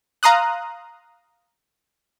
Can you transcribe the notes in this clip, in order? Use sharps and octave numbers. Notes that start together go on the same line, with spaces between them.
F5 A#5 C6 D#6 F#6